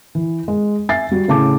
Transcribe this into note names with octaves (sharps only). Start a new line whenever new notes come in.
E3
G#3
E5 G#5 A6 C7
G3 F#4
A2 C#3 A5 D6